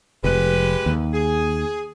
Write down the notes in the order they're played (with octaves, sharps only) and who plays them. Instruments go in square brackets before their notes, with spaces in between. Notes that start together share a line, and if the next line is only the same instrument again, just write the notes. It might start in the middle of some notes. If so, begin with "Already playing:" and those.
[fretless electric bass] F1 [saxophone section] G#3 G4 B4
[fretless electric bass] D#2
[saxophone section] G#4